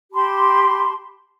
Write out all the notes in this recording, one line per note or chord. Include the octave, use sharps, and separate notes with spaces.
G4 A5 B5 C6